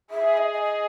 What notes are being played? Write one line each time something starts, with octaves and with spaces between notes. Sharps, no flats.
G#4 E5
D#5
E5
D#5
D#5